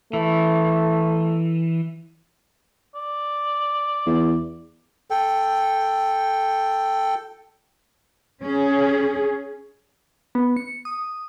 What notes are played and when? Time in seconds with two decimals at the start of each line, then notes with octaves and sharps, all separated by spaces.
0.13 E3 A3
2.95 D5
4.06 E2
5.10 A4 G5
8.43 C#4 G#4
10.35 B3
10.57 C#7
10.85 D#6